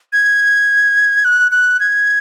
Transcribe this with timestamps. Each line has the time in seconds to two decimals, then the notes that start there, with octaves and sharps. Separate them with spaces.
0.13 G#6
1.25 F#6
1.51 F#6
1.80 G#6